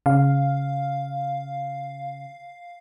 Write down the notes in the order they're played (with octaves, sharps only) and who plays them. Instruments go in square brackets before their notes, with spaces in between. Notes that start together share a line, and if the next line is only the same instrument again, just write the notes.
[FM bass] C#3 [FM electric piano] F5